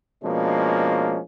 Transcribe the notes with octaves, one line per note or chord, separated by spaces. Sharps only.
B2 F3 G#3 A#3 C#4 D4